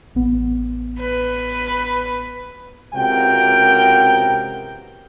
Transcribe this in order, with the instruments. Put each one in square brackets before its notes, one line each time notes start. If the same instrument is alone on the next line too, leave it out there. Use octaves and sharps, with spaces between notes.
[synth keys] A1 B3
[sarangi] B4
[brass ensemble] C#2 C3 B3 F#4 A#4 G5